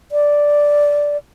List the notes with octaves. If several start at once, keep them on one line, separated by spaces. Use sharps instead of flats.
D5